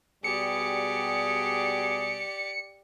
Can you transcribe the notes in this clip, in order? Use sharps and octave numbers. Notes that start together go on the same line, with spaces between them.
B2 G3 G4 G#4 D5 C#7